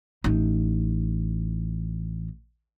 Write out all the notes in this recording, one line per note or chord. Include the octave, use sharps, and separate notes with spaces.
A1 D#4